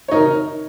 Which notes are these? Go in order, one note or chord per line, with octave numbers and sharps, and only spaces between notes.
D#4 A#4 C#5